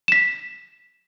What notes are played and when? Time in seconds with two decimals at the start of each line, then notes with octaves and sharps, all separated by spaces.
0.08 B6 E7